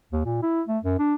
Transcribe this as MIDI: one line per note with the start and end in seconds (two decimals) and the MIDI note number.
0.12 0.23 39
0.26 0.38 46
0.42 0.62 64
0.68 0.79 57
0.84 0.98 42
0.99 1.15 62